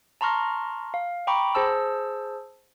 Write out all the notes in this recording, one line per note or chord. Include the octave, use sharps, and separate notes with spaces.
A5 A#5 C6 C#6 F6 A#6
F5
G5 A#5 B5 C#6 D6
G#4 C5 A5 E6